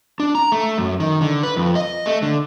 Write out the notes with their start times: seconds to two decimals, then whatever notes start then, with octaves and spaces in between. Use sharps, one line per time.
0.20 D4
0.35 A#5
0.52 A3
0.78 F#2
1.00 D#3
1.21 D3
1.43 B4
1.56 F2
1.75 D#5
2.06 A3
2.22 D3